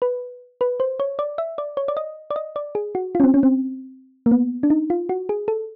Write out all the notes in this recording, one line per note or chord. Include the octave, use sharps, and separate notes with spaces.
B4
B4
C5
C#5
D5
E5
D5
C#5
D5
D#5
D5
D#5
D5
G#4
F#4
C#4 F4
C4
C#4
C4
A#3
B3
D4
D#4
F4
F#4
G#4
A4